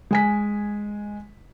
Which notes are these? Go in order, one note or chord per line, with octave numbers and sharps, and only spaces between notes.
G#3 G#5 B6